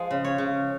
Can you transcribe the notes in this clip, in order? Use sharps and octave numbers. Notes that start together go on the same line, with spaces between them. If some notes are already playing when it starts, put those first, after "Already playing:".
Already playing: F3 G#3
C#3
C#5
C#3